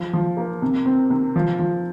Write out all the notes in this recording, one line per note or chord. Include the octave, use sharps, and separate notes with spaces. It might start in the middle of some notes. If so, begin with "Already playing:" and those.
Already playing: F3
F3
A#3
C3
C4
C3
F3
F3